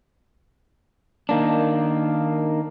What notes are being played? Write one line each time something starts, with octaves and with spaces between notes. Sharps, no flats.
D#3 A#3 D4